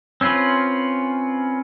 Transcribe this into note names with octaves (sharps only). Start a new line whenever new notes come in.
C4 C#4 F4 B4